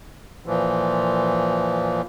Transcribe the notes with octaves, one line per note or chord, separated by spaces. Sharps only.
A#2 E3 F3